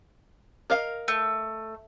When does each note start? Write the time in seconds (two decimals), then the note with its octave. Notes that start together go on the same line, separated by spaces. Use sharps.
0.70 A#4 D#5 F5
1.08 A3